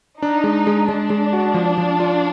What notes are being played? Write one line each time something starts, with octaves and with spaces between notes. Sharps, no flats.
D4 D#4
G#3
G#3
G#3 D4
G#3
F#4
F3
F3
F4